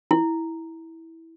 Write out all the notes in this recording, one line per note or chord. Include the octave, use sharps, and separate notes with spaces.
E4